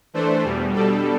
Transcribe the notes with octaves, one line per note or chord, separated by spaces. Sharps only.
E3 A3 D4 A4 C5
E2 B2 G3
B2 G3 D4 A4